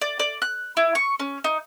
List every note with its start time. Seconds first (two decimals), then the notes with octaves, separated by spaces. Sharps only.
0.01 D5
0.19 D5
0.42 F#6
0.77 E4
0.95 C#6
1.20 C#4
1.44 D#4